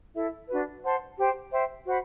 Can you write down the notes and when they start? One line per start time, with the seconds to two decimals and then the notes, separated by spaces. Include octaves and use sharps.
0.15 E4 A4 E5
0.49 D4 F#4 B4
0.84 C5 F#5 A5 C6
1.18 G4 C5 G5
1.52 C5 E5 G5
1.86 F#4 C5 F#5 B5